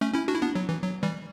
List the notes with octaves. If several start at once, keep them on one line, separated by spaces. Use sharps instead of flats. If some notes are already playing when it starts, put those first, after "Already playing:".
A3 C#4
C#4 E4
D4 F#4
E4
B3 D4
F#3
E3
F#3
E3 G3